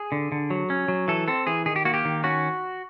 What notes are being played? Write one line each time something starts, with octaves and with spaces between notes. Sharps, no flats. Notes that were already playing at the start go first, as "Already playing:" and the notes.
Already playing: G#4
D3
D3
F#3
C#4
F#3
E3 A4
C4 A4
E3 G#4
D#3 G#4
G4
A#3 F#4
G4
D#3
C#4 F#4